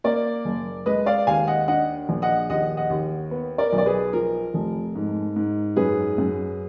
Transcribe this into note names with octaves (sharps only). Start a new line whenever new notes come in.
A#3 A#4 D5
F#1
G#3 B4 D#5
D5 F5
D#2 F5 G#5
D#5 F#5
D4 D#5 F#5
A#1
D#5 F#5
D#2 D#5 F#5
D#5 F#5
D#2
B3
A#4 D5
B1
D5
G#4 B4
F3 A#4
F1
G#2
G#2
F#2 G#4 B4
F#2